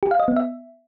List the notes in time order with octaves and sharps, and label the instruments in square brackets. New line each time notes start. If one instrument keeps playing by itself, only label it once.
[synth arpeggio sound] G4
F5
D#5
B3
E5